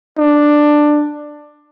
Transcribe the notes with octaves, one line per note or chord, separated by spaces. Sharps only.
D4